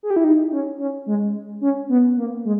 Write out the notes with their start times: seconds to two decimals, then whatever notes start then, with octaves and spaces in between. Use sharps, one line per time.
0.03 G#4
0.10 G4
0.16 E4
0.24 D#4
0.51 C#4
0.79 C#4
1.06 G#3
1.61 C#4
1.89 B3
2.17 A#3
2.45 G#3